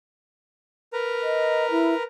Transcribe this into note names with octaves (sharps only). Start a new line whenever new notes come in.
A#4 B4 A#5
D#5
E4